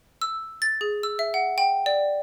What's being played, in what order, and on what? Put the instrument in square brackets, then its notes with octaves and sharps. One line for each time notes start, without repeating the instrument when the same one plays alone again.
[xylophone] E6
A6
G#4
E6
E5
F#5
G5
D5